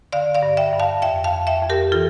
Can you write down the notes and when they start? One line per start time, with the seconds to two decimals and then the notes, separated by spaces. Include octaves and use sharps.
0.12 D3 D5 F5
0.35 D5 F5
0.42 G2
0.57 E5 G5
0.73 G2
0.80 F5 A5
1.02 F2 E5 G5
1.24 F5 A5
1.32 F2
1.47 E5 G5
1.62 F2
1.70 G4 A#4
1.92 E3 F4 A4